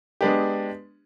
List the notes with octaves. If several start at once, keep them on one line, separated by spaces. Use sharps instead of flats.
G#3 B3 D4 G4